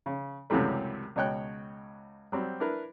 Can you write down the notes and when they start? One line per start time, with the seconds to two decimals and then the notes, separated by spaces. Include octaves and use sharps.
0.06 C#3
0.50 C#2 F#2 C3 E3 G3 A3
1.16 C#2 B2 C#5 G5 F#6
2.32 F#3 G3 C4
2.60 D4 E4 A#4 B4